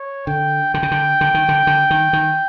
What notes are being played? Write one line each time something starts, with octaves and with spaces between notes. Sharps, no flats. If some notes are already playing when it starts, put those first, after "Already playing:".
Already playing: C#5
D3 G5
D3 G5
C#3
D3
D3
D#3
D3
D3
D#3
D#3